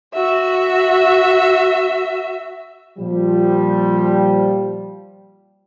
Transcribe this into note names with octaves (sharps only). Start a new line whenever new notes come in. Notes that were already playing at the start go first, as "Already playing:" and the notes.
F#4 E5
A#2 F3 G3